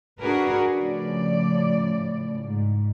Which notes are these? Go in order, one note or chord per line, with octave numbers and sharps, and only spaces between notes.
D4 F#4 G#4 A#4 B4
A2 C#3 F3 D5
G#2